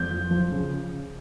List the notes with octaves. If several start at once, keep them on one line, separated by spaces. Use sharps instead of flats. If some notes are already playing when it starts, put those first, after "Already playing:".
Already playing: F2 G6
F3
F3
C#3